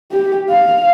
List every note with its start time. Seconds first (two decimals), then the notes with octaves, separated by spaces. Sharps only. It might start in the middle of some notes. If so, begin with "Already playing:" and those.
0.12 G4
0.50 F5